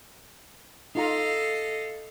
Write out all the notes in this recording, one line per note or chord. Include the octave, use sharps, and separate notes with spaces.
D#4 F4 A4 D#5 F5 A#5